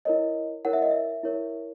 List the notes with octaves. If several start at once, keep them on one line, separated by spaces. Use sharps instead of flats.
E4 A#4 C#5 D#5
E4 A#4 C#5 F#5
E5
D#5
E5
E4 A#4 C#5